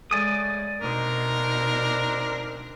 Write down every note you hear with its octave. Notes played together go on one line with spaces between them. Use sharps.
C#3 G#3 A3 D5 G#5 D#6
D2 B2 C4 D4 D#4 A#4